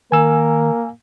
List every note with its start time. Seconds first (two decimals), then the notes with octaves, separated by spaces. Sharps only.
0.12 D#3 A#3 A#4 G#5 E6